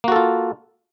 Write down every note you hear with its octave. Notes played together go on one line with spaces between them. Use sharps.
A#3 F4 F#4 A4